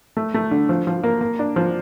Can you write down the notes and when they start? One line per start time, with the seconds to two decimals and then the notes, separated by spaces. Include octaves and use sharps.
0.17 A3
0.34 A3
0.51 D3
0.69 F3
0.87 F3
1.03 A#3
1.21 A#3
1.39 D4
1.56 F3